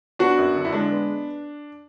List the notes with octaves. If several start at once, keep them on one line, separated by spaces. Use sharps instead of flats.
B3 D4 F#4
F#2
D3
E4
G#3 D4
B3